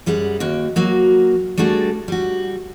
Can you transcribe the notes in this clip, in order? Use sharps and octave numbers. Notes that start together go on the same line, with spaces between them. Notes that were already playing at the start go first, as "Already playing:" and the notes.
F#2 G3 G#4 F#5
D#2 A#3 F#4 G5
F#3 A#3 F#4
G3 A3 D4 F#4 G#4 A4
G3 F#4